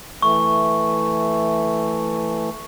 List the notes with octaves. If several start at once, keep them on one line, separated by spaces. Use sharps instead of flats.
E3 A3 C#6